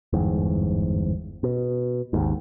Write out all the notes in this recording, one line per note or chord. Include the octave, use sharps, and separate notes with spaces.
G1 E2 G#2
B2
G#1 D#2 G#2